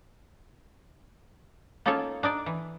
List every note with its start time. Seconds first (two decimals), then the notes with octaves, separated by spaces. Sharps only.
1.86 A#3 C#4 D#4 F4 A4 C#5
2.23 D4 D#4 D5
2.46 E3